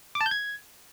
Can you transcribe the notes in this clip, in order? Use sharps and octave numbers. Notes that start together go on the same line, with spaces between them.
D6
A5
G6
G#6